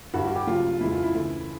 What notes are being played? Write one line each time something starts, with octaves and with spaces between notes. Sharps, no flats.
G2 D3 G3 F#4
F#4
G4
D#2 C#3 F#3 F4
F2 C#3 E3 G#3 E4
F4
E4
D2 C#3 E3